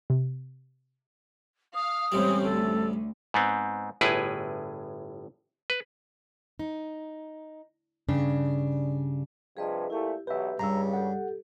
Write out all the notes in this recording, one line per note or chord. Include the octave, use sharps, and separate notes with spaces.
C3
F5 D#6
A1 C3 G3 G#3 C4 C#4
D2 A4
G#2 B3 C4
G1 A2 E4 G#4 B4
B4
D#4
G2 C#3 D4
G2 C3 F3 G#4 B4 D#5
A#2 A3 E4 G4
B1 G4 B4 E5
C#2 G2 C#3 A#5 E6
G4 A4 F#5